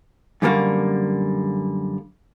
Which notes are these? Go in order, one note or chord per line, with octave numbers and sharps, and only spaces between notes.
F#2 D3 G3 A#3 F#4